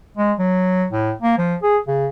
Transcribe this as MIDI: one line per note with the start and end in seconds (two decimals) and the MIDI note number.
0.17 0.33 56
0.39 0.85 54
0.91 1.13 45
1.22 1.35 58
1.38 1.56 53
1.63 1.78 68
1.88 2.08 49